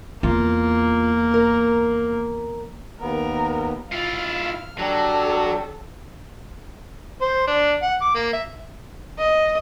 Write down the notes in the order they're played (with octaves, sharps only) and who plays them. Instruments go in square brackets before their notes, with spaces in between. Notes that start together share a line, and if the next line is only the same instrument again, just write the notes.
[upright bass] E2 [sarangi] A#3 [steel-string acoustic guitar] F4
[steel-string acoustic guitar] A#4
[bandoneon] D#2 B3 [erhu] A#4
[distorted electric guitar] E4 F4 [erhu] F5 [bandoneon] F6
[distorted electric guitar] F#3 [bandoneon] D4 G4 [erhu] A4
[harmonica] C5
D4
F#5
D6
A#3
E5
[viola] D#5